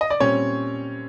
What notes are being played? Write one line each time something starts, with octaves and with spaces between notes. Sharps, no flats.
D#5
D5
A#2 G3 C4 C#4 C#5